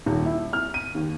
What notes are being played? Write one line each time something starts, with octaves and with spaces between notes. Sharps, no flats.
D#1
E4
F6
D#7
D#2